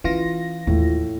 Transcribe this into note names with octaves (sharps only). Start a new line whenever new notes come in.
E3 C#4 F4 A#6
D#2 A2